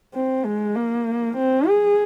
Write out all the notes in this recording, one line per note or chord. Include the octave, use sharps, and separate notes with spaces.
C4
G#3
A#3
C4
G#4